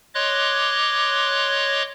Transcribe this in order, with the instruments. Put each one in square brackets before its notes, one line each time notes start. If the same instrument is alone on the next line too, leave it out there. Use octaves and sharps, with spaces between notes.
[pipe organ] C#5 D#5 C6 D6 F#6